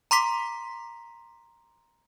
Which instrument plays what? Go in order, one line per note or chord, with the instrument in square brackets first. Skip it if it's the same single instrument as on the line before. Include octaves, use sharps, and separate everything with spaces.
[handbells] A#5 C6 D6 B6